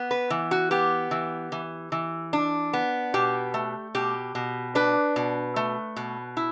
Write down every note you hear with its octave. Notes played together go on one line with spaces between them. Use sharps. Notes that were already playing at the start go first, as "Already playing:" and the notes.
Already playing: B3
B4
E3
F#4
B3 G4
E3
E3
E3
D4
B3
B2 G4
A3
B2 G4
B2
D4 B4
B2
A3
B2
E4